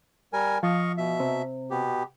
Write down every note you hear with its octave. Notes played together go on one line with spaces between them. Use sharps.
G3 A#4 G#5
F3 D#5 F5 C#6
B2 E5
C3
B2 B3 G4